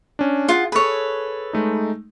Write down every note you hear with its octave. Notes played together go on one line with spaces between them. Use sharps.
C#4 D4
F4 G#4 F#5
G#4 A4 B4 C#5
G#3 A3 D#4